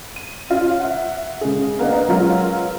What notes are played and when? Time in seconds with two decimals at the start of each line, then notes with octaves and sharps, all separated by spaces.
0.16 D#7
0.50 C#4 F4
0.79 E5 F#5
1.41 C#3 G#3 G#4
1.79 A#3 B3 D4 D#5
2.08 F#3 G#3 B3 C#4 F4 A#4